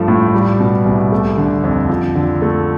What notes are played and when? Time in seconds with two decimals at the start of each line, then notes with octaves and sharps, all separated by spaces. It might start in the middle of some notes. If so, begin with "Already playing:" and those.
Already playing: G2 F3 A3
0.08 A2
0.34 G3
0.60 B2
0.86 C2
1.12 A3
1.37 D3
1.64 F2
1.90 F3
2.15 D3
2.42 A3